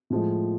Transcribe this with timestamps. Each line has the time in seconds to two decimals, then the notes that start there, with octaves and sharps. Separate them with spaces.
0.10 A2 F3 G#3